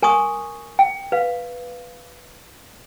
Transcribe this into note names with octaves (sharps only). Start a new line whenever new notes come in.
A#4 G#5 C6 C#6 D#6
G5
B4 F5